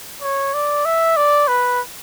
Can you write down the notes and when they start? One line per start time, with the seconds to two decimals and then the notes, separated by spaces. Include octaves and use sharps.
0.22 C#5
0.54 D5
0.85 E5
1.17 D5
1.48 B4